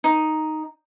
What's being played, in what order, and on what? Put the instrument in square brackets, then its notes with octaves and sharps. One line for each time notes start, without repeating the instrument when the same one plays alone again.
[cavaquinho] D#4